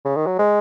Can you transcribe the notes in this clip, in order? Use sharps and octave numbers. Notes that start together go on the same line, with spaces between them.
C#3
D#3
F#3
G#3